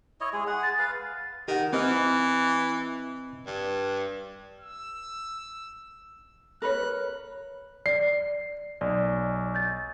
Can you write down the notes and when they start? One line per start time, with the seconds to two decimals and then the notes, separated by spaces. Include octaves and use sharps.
0.21 E4 C#5 D#5
0.33 G#3 G#4
0.47 G#4 F#5
0.63 A6
0.79 B4 F5
1.48 D#3 G4 F#5
1.73 E3 C4 D#5 F6
3.47 G2
4.61 E6
6.62 A#4 B4 C#5 F#6
7.86 D5 C7
8.81 B1 D5
9.55 G6 A6